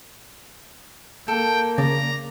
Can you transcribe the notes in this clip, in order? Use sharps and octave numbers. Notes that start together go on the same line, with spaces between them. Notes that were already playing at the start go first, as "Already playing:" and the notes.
A#3 A4 G5
C#3 D5 A#5